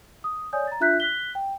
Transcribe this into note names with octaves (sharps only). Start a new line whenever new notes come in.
D#6
C#5 D5 G#5 D#6 G6
A#5 A6
D4 F4 E5 F#6 G6 B6
F#6 B6 G7
G5